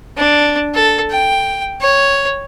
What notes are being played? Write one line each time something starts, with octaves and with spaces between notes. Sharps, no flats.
D4
A4
G5
C#5